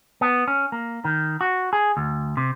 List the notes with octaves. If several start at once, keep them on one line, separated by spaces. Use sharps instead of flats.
B3
C#4
A#3
D#3
F#4
G#4
D2
C3